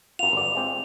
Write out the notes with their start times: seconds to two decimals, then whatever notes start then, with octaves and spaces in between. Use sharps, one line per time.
0.19 F#2 F4 F7
0.33 G1 D5
0.55 G#3 C4 F4